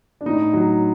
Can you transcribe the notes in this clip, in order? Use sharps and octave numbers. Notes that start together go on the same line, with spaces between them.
D4
A2 D#4
F#3